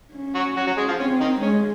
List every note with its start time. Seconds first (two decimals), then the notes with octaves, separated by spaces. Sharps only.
0.14 C#4
0.35 F#3 F#4
0.57 F#3 F#4
0.67 F#3 F#4
0.77 G#3 G#4
0.88 F3 F4
0.99 C4 C#4
1.21 D#3 D#4
1.42 G#3 C#4